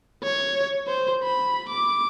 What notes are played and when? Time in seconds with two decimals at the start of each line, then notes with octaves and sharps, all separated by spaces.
0.23 C#5
0.87 C5
1.23 B5
1.69 D6